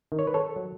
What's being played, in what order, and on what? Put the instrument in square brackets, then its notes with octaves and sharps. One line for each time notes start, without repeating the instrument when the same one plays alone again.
[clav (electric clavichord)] D#3
C#5
B4
A4 C#5
F#3